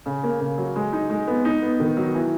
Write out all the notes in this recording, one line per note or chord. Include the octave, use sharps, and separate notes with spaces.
C#3
A#3
C#3
F#3
G#3
D#4
G#3
B3
D#4
B3
D#3
F#3
E3